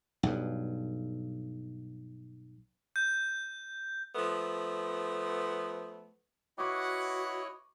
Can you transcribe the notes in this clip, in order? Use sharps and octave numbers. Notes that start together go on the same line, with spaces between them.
B1 G2
G6
F3 A3 B3
E4 F#4 B4 C#5 D#5 F#5 C#6 D6